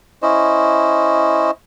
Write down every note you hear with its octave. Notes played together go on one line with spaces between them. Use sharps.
C#4 E4 C5 D#5